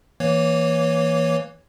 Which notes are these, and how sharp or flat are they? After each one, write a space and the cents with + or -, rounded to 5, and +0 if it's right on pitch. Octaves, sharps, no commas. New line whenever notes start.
E3 +0 A#3 +0 C#5 +5